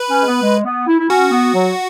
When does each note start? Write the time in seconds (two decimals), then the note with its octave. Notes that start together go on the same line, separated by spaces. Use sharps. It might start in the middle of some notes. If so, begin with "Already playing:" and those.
Already playing: B4
0.10 C#4
0.22 G#3
0.27 B3
0.42 G#3
0.65 B3
0.87 E4
0.99 E4
1.09 C#4 F#4
1.31 B3
1.54 F#3